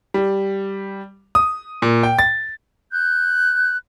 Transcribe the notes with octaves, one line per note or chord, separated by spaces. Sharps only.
G3
D#6
A#2
G5
A6
F#6 G6